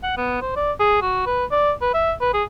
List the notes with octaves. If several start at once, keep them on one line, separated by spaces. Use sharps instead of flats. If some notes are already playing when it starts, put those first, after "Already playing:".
F#5
B3
C5
D5
G#4
F#4
B4
D5
B4
E5
B4
G#4